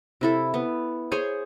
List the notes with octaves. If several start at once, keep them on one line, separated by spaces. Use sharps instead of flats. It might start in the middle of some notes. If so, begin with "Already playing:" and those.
C3 E4 A4
B3
G#4 C5 C#5 G#5